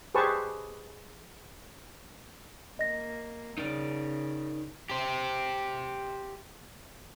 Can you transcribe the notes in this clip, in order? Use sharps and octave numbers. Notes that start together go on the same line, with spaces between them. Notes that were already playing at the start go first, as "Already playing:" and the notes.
G4 G#4 B4 C5 A5 C#6
A#3 D#5 A#6
C#3 D#4 A#4 D5
G4 C5